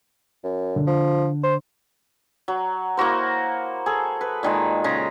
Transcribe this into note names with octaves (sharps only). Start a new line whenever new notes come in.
F#2
D3
F3
C5
F#3
A#3 E4 F#4 C5
G#4 A4
B4
A#2 D#3 G#3
C#3 A#5